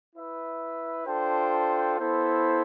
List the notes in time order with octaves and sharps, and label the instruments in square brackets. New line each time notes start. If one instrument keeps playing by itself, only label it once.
[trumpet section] E4 B4 E5
D4 F4 A4 C5 G5
B3 E4 A4 C5